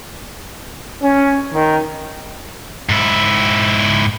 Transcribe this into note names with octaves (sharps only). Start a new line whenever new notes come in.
C#4
D#3
G#2 E4